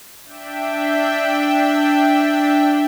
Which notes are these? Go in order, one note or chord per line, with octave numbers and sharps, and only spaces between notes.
D4 E5 G5